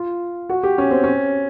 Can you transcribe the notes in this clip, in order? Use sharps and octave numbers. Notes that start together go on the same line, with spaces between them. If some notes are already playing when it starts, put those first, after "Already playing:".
Already playing: F4
F#4
G4
C#4
C4
C#4